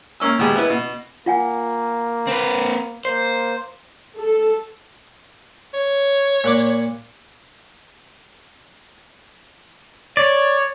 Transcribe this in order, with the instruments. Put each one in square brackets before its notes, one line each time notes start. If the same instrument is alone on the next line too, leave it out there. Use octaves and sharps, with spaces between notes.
[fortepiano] A#3 C#4 E6
D#2 B2 G#3 G4 G#4
B3 E4 B4
B2
[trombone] A#3 [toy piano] F4 F#5 G#5
[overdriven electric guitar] C4 B4
[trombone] A#3 [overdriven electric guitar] C5
[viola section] A4
[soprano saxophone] C#5
[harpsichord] A#2 F#5 D6
[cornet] C#5 [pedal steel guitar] D5